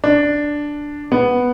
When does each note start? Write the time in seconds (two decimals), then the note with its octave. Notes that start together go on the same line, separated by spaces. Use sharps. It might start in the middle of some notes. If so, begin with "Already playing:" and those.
0.04 D4
1.12 B3